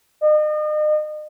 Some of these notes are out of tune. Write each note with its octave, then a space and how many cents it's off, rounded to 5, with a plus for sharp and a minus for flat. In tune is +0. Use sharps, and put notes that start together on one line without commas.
D#5 -40